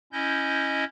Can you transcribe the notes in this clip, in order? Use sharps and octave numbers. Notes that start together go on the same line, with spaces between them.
C#4 E4 D#5 G6